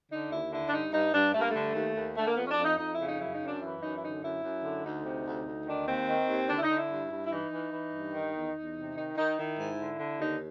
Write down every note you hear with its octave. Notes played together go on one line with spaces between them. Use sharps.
D3 D#4
D#2 E4
D3 E4
D4
G2 D#4
G2 D#4
G2 D4
G2 A3
A#3
A3
D3
D#2
D#2
D3 A3
A#3
F2 B3
C#4
D4
F2
D#4
F2 D#4
E4
C#3
D#4
F#2 E4
D#4
F#2
D4
E3 E4
F#2 D#4
E4
D3 D#4
F#2 E4
F#2
D3
D2 D#4
C3
D2
D2
D#3 D4
D#2 C4
D#3
D#2
D3 D4
E4
D#4
D3
E4
G2
G2
E4
E3 D#4
E3
E3
G2
D#3
E2
E2
C3
D#3 D#4
D#3 D#4
D#3 E4
G#2
D3
D3
D#2 D#4